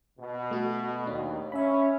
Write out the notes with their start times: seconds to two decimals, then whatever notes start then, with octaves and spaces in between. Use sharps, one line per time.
0.19 B2
0.51 A3 F#4
1.07 D#2 D4
1.52 C#4 E5 B5